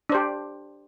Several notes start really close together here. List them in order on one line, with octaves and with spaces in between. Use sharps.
D4 C5 G4